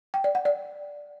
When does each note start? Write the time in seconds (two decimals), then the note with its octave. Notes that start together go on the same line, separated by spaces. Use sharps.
0.14 G5
0.24 D5
0.35 F#5
0.45 D5